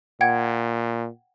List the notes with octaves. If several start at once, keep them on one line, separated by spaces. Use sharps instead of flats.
A#2 F#5 G5 G#6